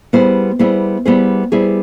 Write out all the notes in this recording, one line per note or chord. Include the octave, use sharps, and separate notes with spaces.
G3 B3 E4 G#4 C5
G3 B3 E4 G#4 C5
G3 B3 E4 G#4 C5
G3 B3 E4 G#4 C5